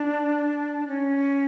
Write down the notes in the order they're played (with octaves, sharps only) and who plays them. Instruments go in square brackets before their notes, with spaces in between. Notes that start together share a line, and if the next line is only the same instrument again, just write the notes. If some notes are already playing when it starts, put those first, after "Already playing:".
Already playing: [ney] D4
C#4